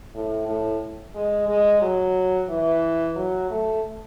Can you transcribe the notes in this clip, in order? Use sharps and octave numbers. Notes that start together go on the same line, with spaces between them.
A2
A2
G#3
G#3
F#3
E3
F#3
A3